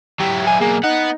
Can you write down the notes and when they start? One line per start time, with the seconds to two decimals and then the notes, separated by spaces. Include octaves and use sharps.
0.20 F#3 E4 G4
0.46 G#5
0.61 B1 A#3 G#4
0.84 B3 D#4 F#5